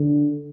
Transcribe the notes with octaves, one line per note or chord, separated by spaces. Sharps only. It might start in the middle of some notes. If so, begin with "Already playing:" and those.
Already playing: D3